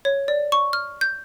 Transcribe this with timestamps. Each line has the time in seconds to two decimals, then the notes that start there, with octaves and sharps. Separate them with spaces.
0.05 C#5
0.28 D5
0.52 C#6
0.73 F6
1.01 G6